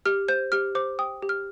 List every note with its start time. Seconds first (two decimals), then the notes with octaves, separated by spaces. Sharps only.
0.06 G4 F6
0.28 C5 G6
0.52 G4 F6
0.75 C5 D6
0.99 G5 D#6
1.22 G4
1.29 F6